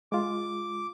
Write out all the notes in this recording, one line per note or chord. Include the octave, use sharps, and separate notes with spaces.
G#3 F4 D6